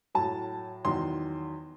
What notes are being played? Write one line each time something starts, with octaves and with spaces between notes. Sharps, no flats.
A2 F#3 A5
E2 D#3 F#3 C6